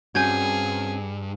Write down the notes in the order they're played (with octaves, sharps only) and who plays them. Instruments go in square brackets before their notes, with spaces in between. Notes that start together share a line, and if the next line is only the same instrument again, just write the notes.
[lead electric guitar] G2 [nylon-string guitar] C4 C#4 F#4 [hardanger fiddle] G#4 [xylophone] G#5 G6 G#6